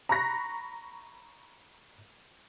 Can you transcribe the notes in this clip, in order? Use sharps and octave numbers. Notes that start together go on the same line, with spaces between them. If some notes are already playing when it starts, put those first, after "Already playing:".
A#5 B5 C#6 F#6 A#6 B6